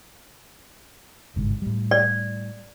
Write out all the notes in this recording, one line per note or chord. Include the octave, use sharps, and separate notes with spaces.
G1 G#2 C3
A2 G3
D5